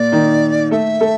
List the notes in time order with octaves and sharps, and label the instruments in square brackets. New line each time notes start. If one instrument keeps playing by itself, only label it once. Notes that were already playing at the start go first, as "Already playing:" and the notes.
Already playing: [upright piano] A#2 A#3 [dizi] D5
[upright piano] D#3 D#4
[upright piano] A3 A4 [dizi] E5
[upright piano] A3 A4